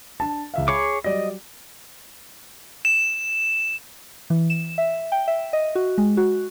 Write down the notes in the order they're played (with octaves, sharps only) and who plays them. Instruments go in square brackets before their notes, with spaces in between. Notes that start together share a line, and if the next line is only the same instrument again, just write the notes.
[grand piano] D4 A5
C#2 E5 F5
[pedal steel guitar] G#4 C#5 D6 [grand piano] B5
[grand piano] F#3 G3 D5 [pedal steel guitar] D#5
[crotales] E7
[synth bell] E3
E7
E5
G5
E5
D#5
F#4
G#3
F#4